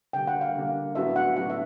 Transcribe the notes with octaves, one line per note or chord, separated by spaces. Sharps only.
D3 G3 A#3 G5
F#5
F5
D3 G3 A#3
A2 F#3 B3 D4 F#4 E5
F#5
A2 F#3 B3 D4 F#4 F#5
E5